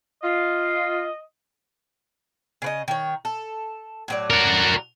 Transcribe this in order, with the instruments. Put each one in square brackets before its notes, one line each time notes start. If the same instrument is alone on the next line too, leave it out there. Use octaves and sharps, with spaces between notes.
[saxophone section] F4 [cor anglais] D#5
[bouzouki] C#3 B4 D#5
D#3 C#5
A4
A2 F#3 D5
[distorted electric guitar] F#4 A#4